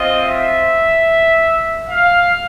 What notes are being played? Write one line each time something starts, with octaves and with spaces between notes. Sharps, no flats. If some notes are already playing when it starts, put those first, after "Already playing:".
Already playing: C4 F4 D#5
E5
F5